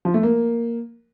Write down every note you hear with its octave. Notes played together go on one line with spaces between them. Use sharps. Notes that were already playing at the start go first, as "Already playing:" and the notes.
F3
A3
A#3